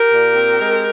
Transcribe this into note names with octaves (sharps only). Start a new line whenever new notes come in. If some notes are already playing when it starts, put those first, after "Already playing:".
Already playing: G4 A#4
A#2
C4
G#3